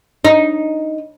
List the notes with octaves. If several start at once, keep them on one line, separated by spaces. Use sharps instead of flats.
D#4